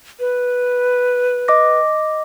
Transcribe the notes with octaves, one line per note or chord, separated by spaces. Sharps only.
B4
D#5 D6 A#6